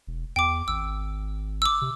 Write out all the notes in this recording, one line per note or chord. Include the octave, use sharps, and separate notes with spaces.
E1
E2 G5 D6
G#1 E6
D6 E6
C3